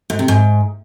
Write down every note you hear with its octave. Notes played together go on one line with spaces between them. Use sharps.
G#2
C3
G#2